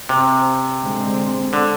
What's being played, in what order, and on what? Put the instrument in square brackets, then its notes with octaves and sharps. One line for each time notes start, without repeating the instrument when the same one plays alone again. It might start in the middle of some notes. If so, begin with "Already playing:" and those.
[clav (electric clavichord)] C3
[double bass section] D3 G#3 C4
[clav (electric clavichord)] D3